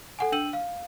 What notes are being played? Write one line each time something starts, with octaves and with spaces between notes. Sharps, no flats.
A4 F#5 G#5
D4 G5 E6 D#7 F#7
F5